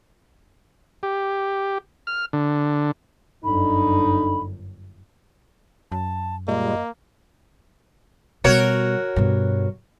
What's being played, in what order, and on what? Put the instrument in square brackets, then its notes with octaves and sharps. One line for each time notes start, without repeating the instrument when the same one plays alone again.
[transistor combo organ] G4
F6
D3
[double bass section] G1 F#2 [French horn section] D4 D#4 A4 [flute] B5
[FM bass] F#2 [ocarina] A5
[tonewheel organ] A#2 G3 G#3 [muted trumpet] A#3 [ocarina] D#5
[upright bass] B2 G3 [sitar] F#4 A#4 C#5
[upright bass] G2 B2